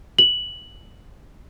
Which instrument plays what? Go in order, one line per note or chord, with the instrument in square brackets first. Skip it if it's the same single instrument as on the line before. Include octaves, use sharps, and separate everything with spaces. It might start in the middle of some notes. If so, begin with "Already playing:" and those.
[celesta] F#7